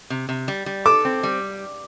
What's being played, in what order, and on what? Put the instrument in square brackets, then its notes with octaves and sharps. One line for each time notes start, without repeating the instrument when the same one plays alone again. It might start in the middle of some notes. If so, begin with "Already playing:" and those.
[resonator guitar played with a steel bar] C3
C3
G3
G3
[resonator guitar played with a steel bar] A4 [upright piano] D6
[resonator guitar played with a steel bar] C4
G3